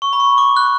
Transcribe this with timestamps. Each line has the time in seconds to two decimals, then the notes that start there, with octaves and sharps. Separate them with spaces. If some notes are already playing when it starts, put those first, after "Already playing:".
0.02 C#6
0.13 B5
0.20 C#6
0.38 D6
0.57 F#6